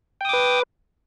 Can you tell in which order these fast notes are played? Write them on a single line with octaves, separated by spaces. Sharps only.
G5 D#6 D6 B4